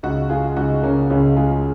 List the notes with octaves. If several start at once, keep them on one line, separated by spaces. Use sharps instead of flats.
C#2 D#4 F#4
G#3 F4 G#4
C#2 D#4 F#4
C#3 A#3 C#4
C#2 C#4 F4
G#3 F4 G#4